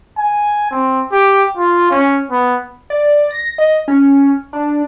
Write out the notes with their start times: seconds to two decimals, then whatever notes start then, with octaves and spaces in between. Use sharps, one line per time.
0.18 G#5
0.71 C4
1.12 G4
1.57 F4
1.91 C#4
2.31 B3
2.90 D5
3.31 A#6
3.58 D#5
3.88 C#4
4.53 D4